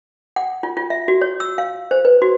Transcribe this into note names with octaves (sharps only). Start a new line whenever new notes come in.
F#5
F4
F4
E5
F#4
C#5
E6
F5
C5
B4
F#4